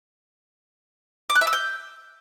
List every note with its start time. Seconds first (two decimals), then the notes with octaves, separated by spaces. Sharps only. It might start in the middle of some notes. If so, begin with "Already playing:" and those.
1.30 D6
1.35 F#6
1.41 E5
1.47 E6
1.53 G6